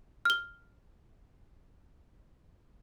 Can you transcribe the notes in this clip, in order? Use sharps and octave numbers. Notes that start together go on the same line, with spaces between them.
F6 G7